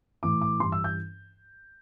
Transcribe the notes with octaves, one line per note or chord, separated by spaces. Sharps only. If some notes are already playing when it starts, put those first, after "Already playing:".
A2 E3 D6
D6
G2 E3 C6
E6
G6